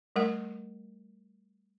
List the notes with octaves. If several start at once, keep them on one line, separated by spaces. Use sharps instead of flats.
G3 A3 A#4 F#5